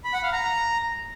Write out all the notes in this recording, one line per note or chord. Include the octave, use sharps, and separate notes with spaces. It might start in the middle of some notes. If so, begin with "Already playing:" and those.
B5
F#5
F5
A#5